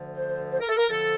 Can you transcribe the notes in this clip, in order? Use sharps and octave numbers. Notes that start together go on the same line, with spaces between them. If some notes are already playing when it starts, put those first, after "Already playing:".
Already playing: D2 D3 F3
C5
C5
A#4
A4
A#4
F2 D3 F3 A4